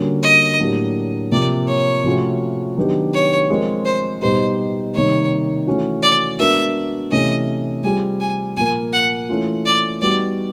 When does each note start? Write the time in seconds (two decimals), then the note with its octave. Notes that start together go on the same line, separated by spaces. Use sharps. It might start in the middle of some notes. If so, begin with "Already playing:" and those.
Already playing: D3 G3 A#3 C#4 F#4
0.23 D#5
0.59 A2 F#3 A#3 D4 G4
1.32 C3 F3 A#3 D5
1.68 C#5
2.04 C3 F3 A3 C#4 F#4
2.77 D#3 F#3 B3 D4 G4
3.14 C#5
3.49 F3 G#3 C4 F4 A#4
3.85 C5
4.22 B2 G3 B3 D#4 G4 C5
4.94 C3 D#3 G3 A#3 D#4 C#5
5.67 E3 A3 C#4 F#4
6.02 D5
6.39 G#3 B3 D4 F#4 A#4 E5
7.11 C3 E3 A3 C#4 D#5
7.84 G3 C4 F4 G#4 G#5
8.20 G#5
8.57 A#2 F3 A#3 G#5
8.93 F#5
9.29 E3 A3 C#4 F4
9.66 D5
10.02 G3 B3 D#4 F#4 D5